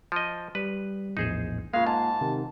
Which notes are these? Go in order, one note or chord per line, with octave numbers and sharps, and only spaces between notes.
F3 D#5
G3 B4
A#1 E2 A2 D#4 G#4 C5
C#3 G#3 A#3 F4 F5
G#2 A5
C3 D#3